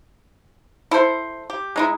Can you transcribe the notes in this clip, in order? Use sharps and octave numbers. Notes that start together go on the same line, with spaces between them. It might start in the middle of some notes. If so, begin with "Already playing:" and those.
E4 A4 C5
G4
G#3 D#4 E4